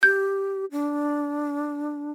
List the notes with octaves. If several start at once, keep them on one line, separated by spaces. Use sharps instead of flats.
G4 G6
D4